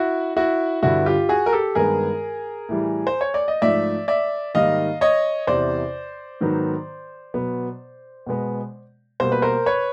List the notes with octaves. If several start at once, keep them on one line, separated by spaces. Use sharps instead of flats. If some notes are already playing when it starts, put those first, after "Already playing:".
Already playing: E4 F#4
E4 F#4
G2 D3 G3 B3 E4 F#4
F4 G4
F#4 G#4
A#4
G4 A4
G2 D#3 G#3 B3 G#4 A#4
A2 E3 G3
C5
C#5
D5
D#5
G#2 F3 A3 D5 E5
D5 E5
G#2 D#3 G3 A#3 D#5 F5
C#5 D#5
E2 C3 E3 C5 D5
G#2 D#3 F#3 B3
B2 F#3 B3
B2 G#3 B3
B2 G3 A#3 C5
B4
A#4 C5
B4 C#5